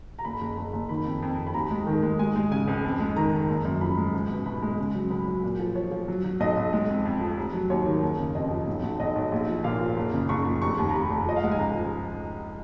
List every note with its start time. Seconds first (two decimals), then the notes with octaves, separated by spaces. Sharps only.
0.19 A#5
0.25 F#1 B5
0.41 F#1
0.57 F#1
0.73 F#1
0.89 D#3 B5
1.05 F2
1.22 F2
1.38 F2
1.47 B5
1.54 D#2 A#5
1.70 G#3
1.87 D#3
2.03 G#3
2.19 G#3 G#5
2.36 G#3
2.52 C#3 G#5
2.68 C#2
2.84 F2
3.00 G#3
3.16 D#3 A#5
3.33 D#3
3.49 F#1
3.65 F#2
3.81 F3 B5
3.97 G#3
4.14 C#2
4.29 B2
4.46 B2 B5
4.62 G#3
4.78 C#3
4.94 F#3
5.10 C#2 B5
5.27 F#3
5.43 A#2
5.60 F3
5.76 F3 C#5
5.91 F3
6.08 F#3
6.24 F#3
6.40 B1 D#5
6.57 B1
6.73 G#3
6.89 F2
7.05 F2
7.22 F3
7.37 F1
7.54 F#3
7.70 D#2 C#5
7.86 D#3
8.02 F#1
8.19 C#3
8.35 F2 D#5
8.51 F3
8.67 B1
8.83 B1
9.00 B1 D#5
9.16 B1
9.32 A#1
9.48 F3
9.64 A#2 F5
9.81 F3
9.97 F#1
10.13 C#3
10.29 F#1 C#6
10.45 F3
10.62 F1 C#6
10.78 D#2
10.89 A#5
10.94 F1 B5
11.10 F1
11.27 F3 D#5
11.36 F5
11.43 G#3 F#5
11.51 G#5
11.58 C#2 A#5
11.75 F3